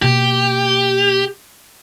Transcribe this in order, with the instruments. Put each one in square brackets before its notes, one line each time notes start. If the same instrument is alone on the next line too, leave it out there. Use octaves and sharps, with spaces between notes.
[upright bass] B2 A#3 [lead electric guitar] G4